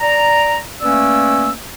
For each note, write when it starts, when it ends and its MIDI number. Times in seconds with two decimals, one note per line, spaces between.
0.01 0.58 74
0.01 0.58 82
0.81 1.51 57
0.81 1.51 58
0.81 1.51 61
0.81 1.51 71
0.81 1.51 74
0.81 1.51 88